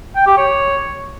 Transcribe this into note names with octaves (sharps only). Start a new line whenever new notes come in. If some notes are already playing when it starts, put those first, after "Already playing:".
G5
G4
C#5